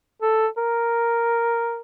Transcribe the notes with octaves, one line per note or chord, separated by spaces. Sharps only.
A4
A#4